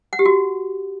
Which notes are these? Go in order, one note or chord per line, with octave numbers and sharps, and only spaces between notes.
F#5
G4
F#4